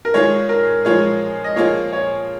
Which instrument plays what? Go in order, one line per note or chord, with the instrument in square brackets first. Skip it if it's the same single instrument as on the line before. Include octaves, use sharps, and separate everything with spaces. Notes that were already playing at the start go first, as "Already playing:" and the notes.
[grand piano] A#4
[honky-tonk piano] D#3 G#3 F4 G#4 [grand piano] C#5
[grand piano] A#4
[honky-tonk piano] F3 G#3 F4 G#4 [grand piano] C#5
[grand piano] D#5
[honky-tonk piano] F3 A#3 F4 G#4 [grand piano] C#5
[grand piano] C#5